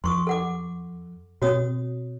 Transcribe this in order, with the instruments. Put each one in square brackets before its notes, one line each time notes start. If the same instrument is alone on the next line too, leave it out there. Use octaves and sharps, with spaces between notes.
[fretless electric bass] F2 [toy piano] C6 C#6 D#6
[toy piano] A4 F#5 D6
[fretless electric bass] B2 C4 [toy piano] F#4 C#5 D#6